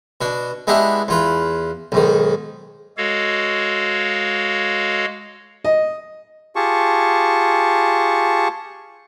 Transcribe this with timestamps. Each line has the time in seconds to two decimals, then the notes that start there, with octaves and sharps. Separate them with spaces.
0.21 B2 D4
0.67 G#3 B3 D4 E4 G4
1.08 E2 F4 B4
1.92 B1 G#2 D#3
2.97 G#3 F#4 A4 C#5 F5
5.64 D#5
6.56 F4 G4 G#4 A5 C#6